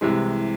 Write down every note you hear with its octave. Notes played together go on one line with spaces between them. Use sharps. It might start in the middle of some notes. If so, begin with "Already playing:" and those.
C2 C3 E3 G#3